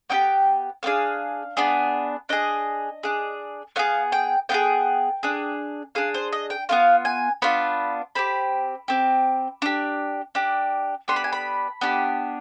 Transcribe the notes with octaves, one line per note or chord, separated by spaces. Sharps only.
B3 D#4 G4 G5
B3 D4 G#4 F5
B3 D4 G#4
D4 G#4 D#5
D4 G#4
B3 F4 G#4 F5
G5
B3 F4 G#4 G5
D4 G#4
D4 G#4 F5
C5
D#5
G5
B3 D4 F4 F5
G#5
B3 D4 F4 B5
C4 G4 B5
C4 G4
D4 G4
D4 G4
B3 D4 G4 C6
B5
G#5
B5
B3 D4 G4